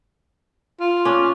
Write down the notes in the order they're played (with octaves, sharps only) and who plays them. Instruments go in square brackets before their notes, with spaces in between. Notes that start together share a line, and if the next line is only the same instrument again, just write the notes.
[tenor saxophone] F4
[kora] C#4 D4